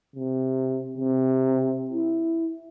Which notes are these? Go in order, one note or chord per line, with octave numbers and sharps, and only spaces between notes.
C3
C3
E4